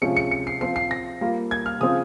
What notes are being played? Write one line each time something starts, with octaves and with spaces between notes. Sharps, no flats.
C3 F3 G#3 C#4 F4 C#7
C#7
C#7
C7
F3 C4 F4 C7
C7
A#6
G3 A#3 F4
G#6
F6
C#3 F3 C4 F4 D#6